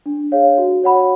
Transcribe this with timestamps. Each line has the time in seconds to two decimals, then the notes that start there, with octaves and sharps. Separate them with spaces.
0.06 D4
0.32 G#4 C#5 F5
0.58 F#4
0.83 C#5 F#5 B5